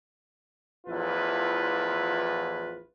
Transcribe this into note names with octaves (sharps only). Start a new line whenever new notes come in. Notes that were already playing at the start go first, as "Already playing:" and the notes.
A1 E2 F3 E4 F4 B4